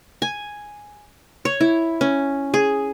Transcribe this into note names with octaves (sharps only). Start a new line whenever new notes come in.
G#5
C#5
E4
C#4
G#4